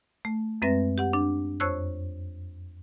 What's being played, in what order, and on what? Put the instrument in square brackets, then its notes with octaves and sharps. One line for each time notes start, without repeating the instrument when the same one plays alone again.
[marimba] A3
F#2 G#3 C4 B4 E5 A#6
G4 F#5
D4
F2 C5 C#5 C#6 E6 F#6